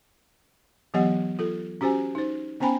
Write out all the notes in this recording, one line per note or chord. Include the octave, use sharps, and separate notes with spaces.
E3 F#3 B3 G4 D#5 F#5
F4 A4
C#4 F#4 G4 C5 G#5
D#4 C5
B3 C#4 C5 G5 G#5 B5